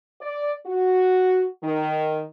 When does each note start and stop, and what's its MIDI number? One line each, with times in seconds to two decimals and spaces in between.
0.21 0.53 74
0.66 1.46 66
1.64 2.24 51